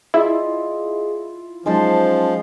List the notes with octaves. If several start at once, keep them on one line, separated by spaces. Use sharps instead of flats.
E4 F4 G#4 D5 D#5
F3 F#3 G#3 C#4 D#4 C5 A5